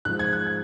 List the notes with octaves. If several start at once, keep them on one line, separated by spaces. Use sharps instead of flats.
G#2 F3 G#3 F#6
G#6
F#6
G#6